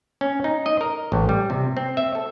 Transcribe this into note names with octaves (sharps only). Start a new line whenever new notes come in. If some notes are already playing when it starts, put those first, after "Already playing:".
C#4
D#4
D#5
A#4
A1
G3
C3
C4
E5
A4